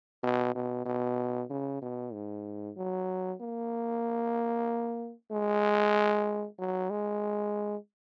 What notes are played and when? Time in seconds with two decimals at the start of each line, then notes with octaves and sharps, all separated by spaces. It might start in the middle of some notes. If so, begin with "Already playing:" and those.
0.23 B2
0.55 B2
0.86 B2
1.50 C#3
1.82 B2
2.13 G#2
2.77 F#3
3.41 A#3
5.31 G#3
6.59 F#3
6.90 G#3